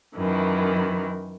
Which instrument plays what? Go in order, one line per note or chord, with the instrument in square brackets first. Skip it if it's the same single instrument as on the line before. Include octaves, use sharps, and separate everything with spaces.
[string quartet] F#2 D#3 E3